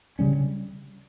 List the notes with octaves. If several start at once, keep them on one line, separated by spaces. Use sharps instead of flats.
C#3 G3 C#4